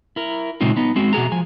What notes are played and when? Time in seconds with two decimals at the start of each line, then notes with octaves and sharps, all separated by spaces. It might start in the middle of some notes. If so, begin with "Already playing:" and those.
0.16 E4 A#4
0.61 A#2 C#3 G#3 C4 D#4 F4
0.77 B3 D#4
0.96 G#3 C4 F#4
1.13 B2 F#4 G#4 A#5
1.32 F3 G#5